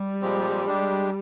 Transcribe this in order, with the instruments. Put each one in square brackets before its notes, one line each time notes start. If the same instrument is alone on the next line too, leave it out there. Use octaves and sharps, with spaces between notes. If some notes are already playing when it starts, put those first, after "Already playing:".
Already playing: [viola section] G3
[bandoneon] A#2 F3 G#3 C4 G4
G#3 D4 G4